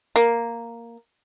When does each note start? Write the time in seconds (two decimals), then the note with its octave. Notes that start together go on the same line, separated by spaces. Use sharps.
0.16 A#3